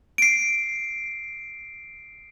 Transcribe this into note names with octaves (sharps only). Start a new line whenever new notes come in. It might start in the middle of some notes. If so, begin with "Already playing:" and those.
C7 D7